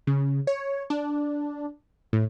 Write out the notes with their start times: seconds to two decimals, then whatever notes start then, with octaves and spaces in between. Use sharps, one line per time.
0.07 C#3
0.47 C#5
0.90 D4
2.13 A2